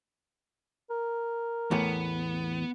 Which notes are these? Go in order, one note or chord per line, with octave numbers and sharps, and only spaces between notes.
A#4
E2 A2 B3